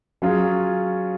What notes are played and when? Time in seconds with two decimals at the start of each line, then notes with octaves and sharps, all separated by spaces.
0.22 F#3 C#4 F4 G#4